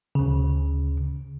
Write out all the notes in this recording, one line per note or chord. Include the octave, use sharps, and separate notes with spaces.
D2 C#3